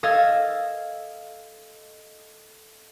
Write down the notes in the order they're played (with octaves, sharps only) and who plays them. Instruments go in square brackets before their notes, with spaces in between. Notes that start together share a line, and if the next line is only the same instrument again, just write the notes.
[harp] A4 D#5 F5 E6 F6 G#6